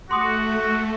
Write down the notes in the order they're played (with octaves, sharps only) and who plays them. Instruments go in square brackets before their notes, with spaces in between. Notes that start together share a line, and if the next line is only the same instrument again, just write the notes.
[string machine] A3 [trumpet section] F#4 [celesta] C6 D6 D#6